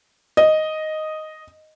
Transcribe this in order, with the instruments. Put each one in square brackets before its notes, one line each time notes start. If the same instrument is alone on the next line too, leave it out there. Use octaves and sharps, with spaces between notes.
[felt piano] D#5